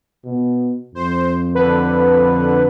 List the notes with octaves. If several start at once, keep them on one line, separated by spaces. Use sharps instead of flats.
B2
F2 C5
D3 B4